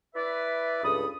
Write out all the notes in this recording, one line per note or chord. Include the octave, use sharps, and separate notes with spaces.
E4 B4 D5 E5
C#2 G2 A4 B5 D#6